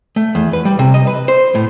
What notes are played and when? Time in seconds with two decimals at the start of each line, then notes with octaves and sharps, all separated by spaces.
0.16 A3
0.35 E2
0.53 B4
0.65 G3
0.79 C3
0.94 D#5
1.07 B4
1.28 C5
1.55 A2